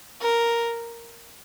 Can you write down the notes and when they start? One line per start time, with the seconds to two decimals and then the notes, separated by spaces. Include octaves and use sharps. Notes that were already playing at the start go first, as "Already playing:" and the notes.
0.22 A#4